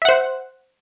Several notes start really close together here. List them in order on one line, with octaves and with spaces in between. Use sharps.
E5 F#5 C5